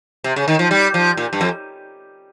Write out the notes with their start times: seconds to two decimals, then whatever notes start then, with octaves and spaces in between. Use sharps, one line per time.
0.24 C3
0.36 C#3
0.48 D#3
0.59 F3
0.71 G3
0.94 F3
1.17 A#2
1.33 G2
1.41 F2